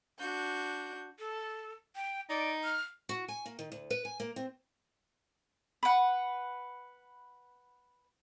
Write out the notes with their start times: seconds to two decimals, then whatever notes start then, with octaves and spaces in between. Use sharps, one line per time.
0.19 D4 F#4 G6
1.19 A4
1.95 G5
2.29 D#4 D5
2.64 F6
3.09 F#4
3.28 G#5
3.46 A#3
3.59 D#3
3.72 D2
3.90 B4
4.05 G#5
4.20 A#3
4.36 C4
5.83 B4 F#5